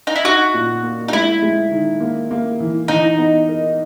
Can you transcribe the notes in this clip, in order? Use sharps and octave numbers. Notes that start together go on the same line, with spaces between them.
D#4
E4
D#4 F#4
A#2
A#3
D#4
G#3 E4
G#3
D#3
A#3
A#3
E3
E3 D#4
B3
A#4